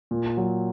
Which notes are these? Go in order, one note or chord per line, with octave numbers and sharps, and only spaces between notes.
A#2
F#3